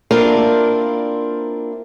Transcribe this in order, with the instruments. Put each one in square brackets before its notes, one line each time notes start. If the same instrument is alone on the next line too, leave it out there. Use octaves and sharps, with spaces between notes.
[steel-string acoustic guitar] A#3 C4 D4 E4 F4 A#4